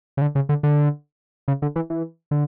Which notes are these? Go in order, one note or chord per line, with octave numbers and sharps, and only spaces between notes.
C#3
D3
C#3
D3
D3
C#3
D3
E3
E3
D3